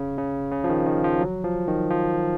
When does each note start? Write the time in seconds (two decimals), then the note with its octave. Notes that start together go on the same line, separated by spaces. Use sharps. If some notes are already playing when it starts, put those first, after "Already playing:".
Already playing: C#3
0.18 C#3
0.52 C#3
0.64 F3
0.69 D#3
0.86 D#3
1.04 F3
1.21 F#3
1.44 F3
1.67 D#3
1.90 F3